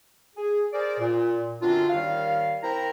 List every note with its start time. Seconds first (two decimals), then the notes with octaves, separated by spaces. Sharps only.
0.36 G#4
0.73 G#4 A#4 C5 D5
0.99 A#2
1.61 F#2 D3 C4 D4 F4
1.90 D#2 D#3 G3 F5
2.62 C4 E4 A#4 G5 A#5